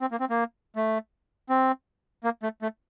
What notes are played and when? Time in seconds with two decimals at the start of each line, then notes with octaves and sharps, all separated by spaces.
0.01 C4
0.11 A#3
0.20 C4
0.30 A#3
0.76 A3
1.49 C4
2.24 A#3
2.43 A3
2.62 A3